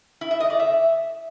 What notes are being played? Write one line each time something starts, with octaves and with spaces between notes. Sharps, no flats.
E4
E5
D#5
D5
E5